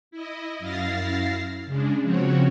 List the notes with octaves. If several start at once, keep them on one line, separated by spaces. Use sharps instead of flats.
E4 D#5
F#2 E4 F5 A6 A#6 C7
C#3 G#3 D4
C#3 F3 C4 F#4 C#5